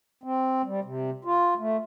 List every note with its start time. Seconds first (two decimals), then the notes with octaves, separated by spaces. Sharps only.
0.24 C4
0.66 G3
0.85 C3
1.25 F4
1.58 A3